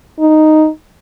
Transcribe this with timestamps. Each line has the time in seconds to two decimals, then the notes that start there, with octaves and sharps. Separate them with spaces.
0.20 D#4